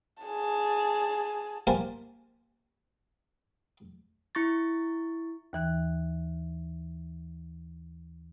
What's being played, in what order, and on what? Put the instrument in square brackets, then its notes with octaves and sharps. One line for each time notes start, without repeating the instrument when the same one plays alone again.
[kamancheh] G#4 A5
[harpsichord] A#3 G4 A#4 C5 G#5 A5
[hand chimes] E4 C#6 A6
[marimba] D#2 E3 F#6